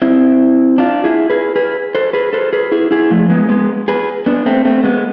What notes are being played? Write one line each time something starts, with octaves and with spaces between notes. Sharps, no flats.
C4 E4
D4 F4
E4 G#4
G#4 B4
G#4 B4
A4 C5
G#4 B4
A4 C5
G#4 B4
E4 G#4
E4 G#4
F3 A3
G#3 B3
G#3 B3
G#4 B4
B3 D4
A3 C4
A3 C4
G#3 B3